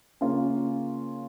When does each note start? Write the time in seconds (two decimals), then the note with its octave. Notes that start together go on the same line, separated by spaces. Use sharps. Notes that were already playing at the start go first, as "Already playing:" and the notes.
0.21 C#3 A#3 C#4 F4 C#5